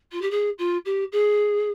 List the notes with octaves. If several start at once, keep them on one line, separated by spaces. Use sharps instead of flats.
F4
G4
G#4
F4
G4
G#4